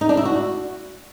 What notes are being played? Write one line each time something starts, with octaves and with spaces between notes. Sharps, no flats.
D#4
D4
E4
F#4